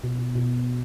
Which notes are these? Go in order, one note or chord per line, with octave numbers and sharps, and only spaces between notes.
B2
B2
B2